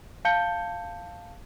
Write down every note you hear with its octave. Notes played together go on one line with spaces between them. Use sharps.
F5 A5 G6 C#7 G7